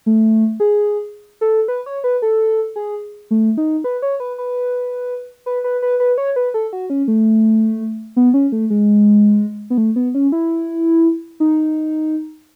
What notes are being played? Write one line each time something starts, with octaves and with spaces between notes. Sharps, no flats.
A3
G#4
A4
B4
C#5
B4
A4
G#4
A3
D#4
B4
C#5
B4
B4
B4
B4
B4
B4
C#5
B4
A4
F#4
C#4
A3
B3
C#4
A3
G#3
B3
A3
B3
C#4
E4
D#4